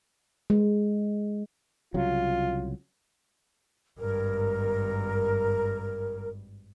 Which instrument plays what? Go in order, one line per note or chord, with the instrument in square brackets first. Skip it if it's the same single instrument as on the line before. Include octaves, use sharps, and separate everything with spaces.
[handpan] G#3
[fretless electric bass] C2 C#3 F#3 [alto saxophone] F4
[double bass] G#1 G2 [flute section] A#4